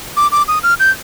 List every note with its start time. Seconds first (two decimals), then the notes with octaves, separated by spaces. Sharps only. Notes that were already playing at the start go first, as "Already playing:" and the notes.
0.17 D6
0.32 D6
0.48 D#6
0.63 F6
0.80 G6